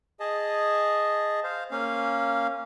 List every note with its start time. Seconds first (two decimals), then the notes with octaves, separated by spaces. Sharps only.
0.20 G#4 D#5 A5
1.44 C5 F5
1.71 A#3 C#4 F5